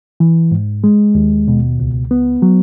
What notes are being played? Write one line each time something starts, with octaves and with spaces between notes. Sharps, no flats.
E3
G#2
G#3
D#2
B2
C#2
B3
F#3